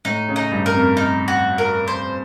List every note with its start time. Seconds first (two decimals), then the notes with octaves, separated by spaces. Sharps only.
0.05 A2 D#4
0.28 C#3
0.36 D#4
0.51 G2
0.66 A#4
0.74 F2
0.97 D#4
1.28 F#4
1.58 A#4
1.88 C5